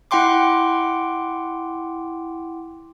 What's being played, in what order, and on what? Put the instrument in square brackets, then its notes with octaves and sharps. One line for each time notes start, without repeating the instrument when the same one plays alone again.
[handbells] E4 F#5 G5 C6 D6